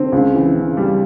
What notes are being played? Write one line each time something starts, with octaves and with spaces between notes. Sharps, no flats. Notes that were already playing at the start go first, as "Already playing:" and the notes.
Already playing: D3 C4
C#2
E3
C#3
G3